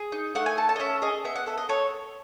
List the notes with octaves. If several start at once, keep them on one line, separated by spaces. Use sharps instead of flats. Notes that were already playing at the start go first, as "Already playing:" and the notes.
Already playing: G#4
D#4
A3 F#5
G#5
A4 A5
A5
D#5
C#4 E5
G#4 D#5
B3 E5
F#5
A4 E5
D#5
A4 C#5